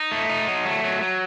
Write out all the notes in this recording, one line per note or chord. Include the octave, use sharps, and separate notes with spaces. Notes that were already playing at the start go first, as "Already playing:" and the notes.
Already playing: D#4
A3
D#4
F#3
A3
F#3
F#3